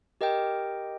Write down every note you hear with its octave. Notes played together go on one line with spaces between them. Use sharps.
G4 A#4 D#5 G5